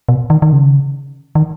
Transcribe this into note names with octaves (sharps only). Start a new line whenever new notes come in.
B2
D#3
D#3
C#3
D#3